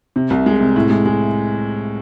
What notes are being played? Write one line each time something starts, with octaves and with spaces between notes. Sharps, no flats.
C3
C2
G#3
C3
A2
G#3
G#3